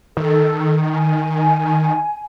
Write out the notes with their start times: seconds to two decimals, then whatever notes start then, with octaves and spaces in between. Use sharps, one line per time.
0.17 D#3 A4
0.93 G#5